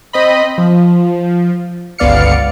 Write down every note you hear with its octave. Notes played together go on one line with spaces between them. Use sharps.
C4 D#5 B5
F3
G1 C#2 B3 D5 F5 C#7